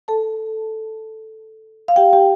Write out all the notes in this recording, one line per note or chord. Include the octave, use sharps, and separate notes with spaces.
A4 A5
F5
G4 G5
G4 G5